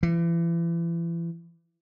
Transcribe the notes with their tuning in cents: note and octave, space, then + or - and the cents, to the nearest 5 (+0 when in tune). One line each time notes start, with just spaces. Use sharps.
E3 +35